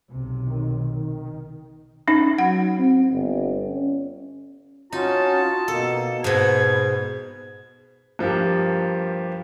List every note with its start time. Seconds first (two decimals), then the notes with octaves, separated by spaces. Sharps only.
0.11 B1 C3
0.47 D#3
2.08 C#4 D#4
2.39 F#3 F#5
2.79 C4
3.11 G1
3.69 C#4
4.92 C#4 D#4 F4 F#4 A5
5.68 B2 A#3 A4
6.24 G#2 B2 B4 G#6
8.19 G2 F3 A#3 F4 G4